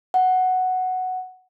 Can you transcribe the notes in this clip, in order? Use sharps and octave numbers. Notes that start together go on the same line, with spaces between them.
F#5